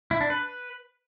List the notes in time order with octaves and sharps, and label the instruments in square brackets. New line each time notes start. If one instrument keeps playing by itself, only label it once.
[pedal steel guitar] E4
D4
B4